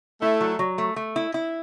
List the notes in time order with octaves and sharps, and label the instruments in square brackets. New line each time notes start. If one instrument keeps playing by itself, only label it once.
[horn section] A3 [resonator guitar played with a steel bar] E4
[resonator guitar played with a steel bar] F#3
F#3
A3
A3
E4
E4